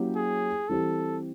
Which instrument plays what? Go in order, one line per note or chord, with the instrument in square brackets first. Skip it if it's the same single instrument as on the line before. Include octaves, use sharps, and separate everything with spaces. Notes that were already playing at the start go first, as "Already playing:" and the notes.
Already playing: [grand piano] F#3 A#3 C#4 E4 G4
[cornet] G#4
[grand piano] E3 G3 C4 E4 G4 [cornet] A4